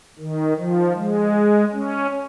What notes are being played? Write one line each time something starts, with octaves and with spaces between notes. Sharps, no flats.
D#3
F3
G#3
C#4